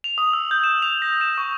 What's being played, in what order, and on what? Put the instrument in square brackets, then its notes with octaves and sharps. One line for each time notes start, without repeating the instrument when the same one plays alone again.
[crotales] F7
D#6
E6
G6
E7
F7
A#6
E7
C#6